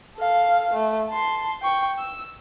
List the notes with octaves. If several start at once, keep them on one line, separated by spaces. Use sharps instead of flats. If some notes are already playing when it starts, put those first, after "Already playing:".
A4 F5
A3
A5 C6
G5 C#6
E6